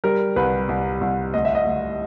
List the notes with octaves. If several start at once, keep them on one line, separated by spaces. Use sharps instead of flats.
G3 A#4
C2 B4
C2
C2
D2 D#5
E5
D#5
D2